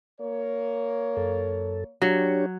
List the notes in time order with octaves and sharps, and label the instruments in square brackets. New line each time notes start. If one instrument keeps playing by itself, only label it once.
[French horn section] A#3 C#5
[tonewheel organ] F#2 A4
[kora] F#3 [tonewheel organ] D4 G4 C#5